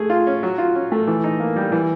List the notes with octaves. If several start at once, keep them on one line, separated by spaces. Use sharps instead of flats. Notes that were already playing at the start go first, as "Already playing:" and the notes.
Already playing: A3 G#4
F4
C#4
F#3
F4
C#4
A3
E3
D#4
A#3
G3
E3